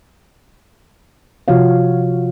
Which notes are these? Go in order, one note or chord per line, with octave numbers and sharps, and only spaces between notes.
C3 F3 F4 F#4 C#5 F5